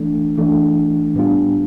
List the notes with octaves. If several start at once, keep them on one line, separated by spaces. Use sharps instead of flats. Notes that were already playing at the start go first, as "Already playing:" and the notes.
Already playing: E3 A3 D4
E3 A3 D4
A2 G3 B3 D4 F4